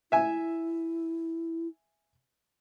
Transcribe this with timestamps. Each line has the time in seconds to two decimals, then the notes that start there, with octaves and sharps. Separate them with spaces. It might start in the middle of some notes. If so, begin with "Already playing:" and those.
0.12 E4 E5 G#5